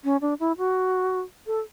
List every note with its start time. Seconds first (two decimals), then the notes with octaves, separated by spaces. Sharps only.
0.04 C#4
0.21 D4
0.40 E4
0.58 F#4
1.47 A4